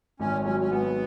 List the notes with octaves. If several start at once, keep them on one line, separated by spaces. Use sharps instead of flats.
G#1 C#4
F#3 C#4
C#4
G#2 B3